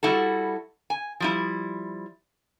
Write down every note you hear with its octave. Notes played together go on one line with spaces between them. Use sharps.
G3 E4 F#4 A4
G#5
F3 G3 E4